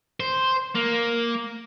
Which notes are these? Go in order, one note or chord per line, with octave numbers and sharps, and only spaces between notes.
C5
A#3